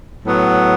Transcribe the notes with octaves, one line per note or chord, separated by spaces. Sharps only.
A2 F#3 B3